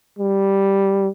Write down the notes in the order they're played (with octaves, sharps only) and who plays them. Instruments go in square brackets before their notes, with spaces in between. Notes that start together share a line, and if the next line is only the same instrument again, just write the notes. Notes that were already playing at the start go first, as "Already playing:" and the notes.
[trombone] G3